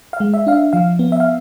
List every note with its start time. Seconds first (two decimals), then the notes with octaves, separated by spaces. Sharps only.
0.13 F5
0.20 G#3
0.34 E5
0.47 D4 F5
0.53 E5
0.73 F3 F5
0.99 B3
1.12 E5
1.20 F5